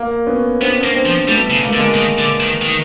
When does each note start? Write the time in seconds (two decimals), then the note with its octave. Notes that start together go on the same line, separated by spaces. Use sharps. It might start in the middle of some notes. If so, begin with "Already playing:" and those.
Already playing: A#3
0.27 B3 C#4
0.60 B3 C4 D4
0.71 D4
0.78 B3 C#4
0.84 A#3
0.94 C4 D4
1.06 F3
1.28 G3 A3 B3
1.50 C#3
1.62 A#3
1.69 A3
1.73 D3
1.76 G#3 A#3
1.95 D#3
2.18 D3
2.40 D#3
2.62 D#3